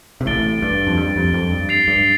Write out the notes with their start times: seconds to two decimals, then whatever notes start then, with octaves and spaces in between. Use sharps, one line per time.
0.21 C3
0.26 A1 A2 A6 D7 G7
0.62 G2
0.87 F2
0.98 G2
1.16 F2
1.34 F2
1.51 G2
1.69 A6 C7 F7
1.88 G2